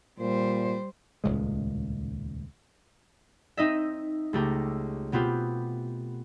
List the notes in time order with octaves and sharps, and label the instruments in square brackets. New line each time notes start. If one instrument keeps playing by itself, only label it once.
[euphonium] A#2 [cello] G3 C5
[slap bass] D#1 C#2 A2 G#3
[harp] C4 D#4 D#5 E5
C#2 A3 G4 A#5
B2 B3 C4 F4 G4